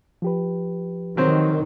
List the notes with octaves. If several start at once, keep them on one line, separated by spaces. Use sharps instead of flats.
F3 G4 B4
D#3 F#3 C4 C5